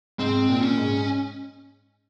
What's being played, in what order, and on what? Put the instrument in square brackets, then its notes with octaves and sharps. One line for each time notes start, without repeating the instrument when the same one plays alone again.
[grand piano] G#2 [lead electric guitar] C4
[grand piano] A#2
[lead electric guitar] C#4
[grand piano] G#2